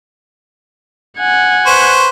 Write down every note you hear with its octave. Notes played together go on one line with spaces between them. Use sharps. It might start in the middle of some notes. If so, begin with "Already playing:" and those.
F#5 G#5
B4 C5 C#6